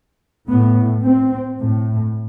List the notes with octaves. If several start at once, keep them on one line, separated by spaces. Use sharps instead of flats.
A2 B3
C4
A2